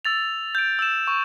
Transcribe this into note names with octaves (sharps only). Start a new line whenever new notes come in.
E6 A6 F7
G6 D7
E6 E7
C#6